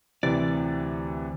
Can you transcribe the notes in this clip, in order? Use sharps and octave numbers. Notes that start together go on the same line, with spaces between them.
D2 C3 E3 D5 A6